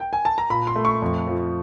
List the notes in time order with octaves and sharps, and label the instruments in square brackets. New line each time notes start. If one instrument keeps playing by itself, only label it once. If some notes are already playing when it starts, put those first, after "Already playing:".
[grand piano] G5
G#5
A5
A#5
A#2 B5
C6
A3
C#6
F2
F3